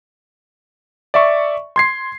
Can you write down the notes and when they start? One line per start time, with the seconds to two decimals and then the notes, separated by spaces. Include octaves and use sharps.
1.14 D5 E5 C#6
1.76 C6 G#6 C7